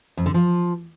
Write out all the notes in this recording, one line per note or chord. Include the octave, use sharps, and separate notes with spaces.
F2
D3
F3